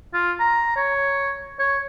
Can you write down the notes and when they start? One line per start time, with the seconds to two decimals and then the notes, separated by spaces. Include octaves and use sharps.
0.14 F4
0.40 A#5
0.77 C#5
1.59 C#5